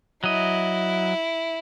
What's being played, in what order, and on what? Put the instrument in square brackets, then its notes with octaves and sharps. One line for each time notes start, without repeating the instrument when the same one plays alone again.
[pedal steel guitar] F#3 D#5 [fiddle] E4